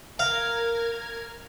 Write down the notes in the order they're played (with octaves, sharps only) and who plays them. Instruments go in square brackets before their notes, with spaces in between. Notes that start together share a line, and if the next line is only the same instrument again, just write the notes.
[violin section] A#4 F6 G#6 [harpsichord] F5